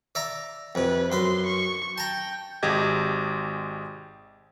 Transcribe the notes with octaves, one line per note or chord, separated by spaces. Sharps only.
D5 E5 A#5
F2 C3 B4
F#2 B4 C6
C#6
G5 A5 A#5
G#1 G#3 G4 D#5 G#6